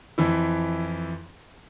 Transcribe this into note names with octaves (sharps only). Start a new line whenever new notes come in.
F2 E3 E4